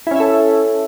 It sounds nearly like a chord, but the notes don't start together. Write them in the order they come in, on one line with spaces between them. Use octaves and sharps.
E4 C#4 E5 A4